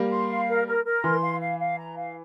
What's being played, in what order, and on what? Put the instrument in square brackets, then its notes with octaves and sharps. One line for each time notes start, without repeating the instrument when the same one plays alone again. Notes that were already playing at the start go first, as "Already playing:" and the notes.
Already playing: [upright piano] G3 A#3
[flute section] C6
F5
A#4
A#4
A#4
[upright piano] E3 [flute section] C6
[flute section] F5
F5
F5
A#5
F5